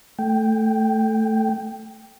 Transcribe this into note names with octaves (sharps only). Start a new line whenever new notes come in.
A3 G5